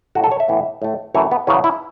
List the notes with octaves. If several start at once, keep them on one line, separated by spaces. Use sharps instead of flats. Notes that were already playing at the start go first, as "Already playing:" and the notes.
A2 F#3 A3 F#4
A4
C#5
E5
A2 E3 B3
A2 A3
F#2 E3 A3 C#5
B3
E2 C#3 F#3 B3 C#4
E4